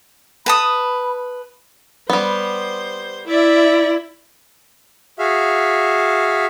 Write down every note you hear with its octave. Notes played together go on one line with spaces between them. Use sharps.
B4 A5 B5 D#6
G3 B3 C5
E4 D5 E5
F#4 G#4 E5 F5